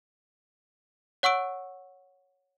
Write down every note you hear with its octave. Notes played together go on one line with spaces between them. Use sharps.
C#5 F#5 C#6 E6 D7